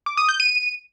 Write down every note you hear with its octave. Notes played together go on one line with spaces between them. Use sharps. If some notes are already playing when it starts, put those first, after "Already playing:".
D6
D#6
G6
D#7